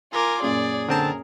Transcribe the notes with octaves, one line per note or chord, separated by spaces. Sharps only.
F4 A#4 G#5 D6
F#2 A#2 G#4 D5
D3 C4 A#4 A5